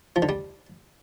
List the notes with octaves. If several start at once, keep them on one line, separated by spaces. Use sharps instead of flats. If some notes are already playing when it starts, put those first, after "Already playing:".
F3
D3
G3